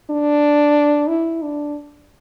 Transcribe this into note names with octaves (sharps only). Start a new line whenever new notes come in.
D4
E4
D4